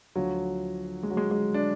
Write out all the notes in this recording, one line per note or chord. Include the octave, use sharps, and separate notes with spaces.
D2 D3 F3 F#3
G#3
F#3
G#3
G#3
D4